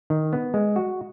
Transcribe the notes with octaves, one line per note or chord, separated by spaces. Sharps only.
D#3
B3
G#3
F#4